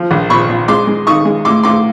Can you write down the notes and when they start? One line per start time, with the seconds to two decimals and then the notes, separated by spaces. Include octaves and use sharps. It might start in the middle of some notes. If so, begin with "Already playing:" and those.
Already playing: F3
0.11 A#1
0.30 A#2 B5 C#6
0.49 A#2
0.68 G#3 C6 D6
0.87 G#3
1.07 D#3 C#6 D#6
1.25 G#3
1.45 A2 C6 D6
1.63 A2 C6 D6